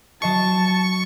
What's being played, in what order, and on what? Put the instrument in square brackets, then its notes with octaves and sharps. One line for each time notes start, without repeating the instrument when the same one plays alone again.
[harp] F#3 D#5 C7 [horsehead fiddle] A5 [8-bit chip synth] C#6